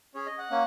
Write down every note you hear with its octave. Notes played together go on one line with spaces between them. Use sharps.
C#4 G#4 C#5
D#5
F#5
A#3 C#4